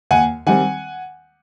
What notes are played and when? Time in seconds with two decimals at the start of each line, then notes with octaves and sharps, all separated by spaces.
0.11 D#2 F#5 G#5
0.46 D#3 G3 C4 F#5 G#5